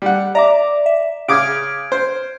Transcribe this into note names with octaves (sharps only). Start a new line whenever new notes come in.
G3 F#5
D5 E5 A#5 D6
E5
C#3 D6 D#6 F6 G#6 D7
C5